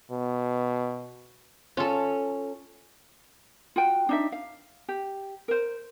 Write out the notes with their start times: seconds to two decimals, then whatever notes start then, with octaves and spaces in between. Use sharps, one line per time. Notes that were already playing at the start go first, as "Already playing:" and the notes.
0.11 B2
1.77 C#4 F4 A4
3.76 F4 F#4 G5
4.09 D4 D#4 E5
4.32 F5
4.89 G4
5.48 A#4 C5